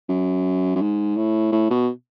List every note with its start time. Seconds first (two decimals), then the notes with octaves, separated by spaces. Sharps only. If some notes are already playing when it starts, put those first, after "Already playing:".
0.09 F#2
0.75 F#2
0.81 G#2
1.17 A2
1.52 A2
1.70 B2